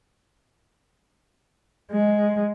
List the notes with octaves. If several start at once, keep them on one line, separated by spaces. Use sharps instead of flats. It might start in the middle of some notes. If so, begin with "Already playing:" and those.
G#3